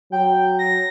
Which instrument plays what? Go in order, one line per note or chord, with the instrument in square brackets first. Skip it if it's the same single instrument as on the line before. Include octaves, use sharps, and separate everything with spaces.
[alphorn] F#3 [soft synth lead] G5
[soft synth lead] A#6